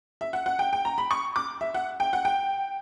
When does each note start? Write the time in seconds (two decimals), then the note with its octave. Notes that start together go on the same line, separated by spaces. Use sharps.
0.21 E5
0.33 F#5
0.46 F#5
0.59 G5
0.73 G5
0.85 A#5
0.98 B5
1.11 C#6
1.36 D6
1.61 E5
1.74 F#5
2.00 G5
2.13 F#5
2.25 G5